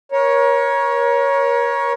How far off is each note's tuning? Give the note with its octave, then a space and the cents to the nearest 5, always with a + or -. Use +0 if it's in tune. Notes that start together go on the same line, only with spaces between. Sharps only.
A#4 +35 C#5 +0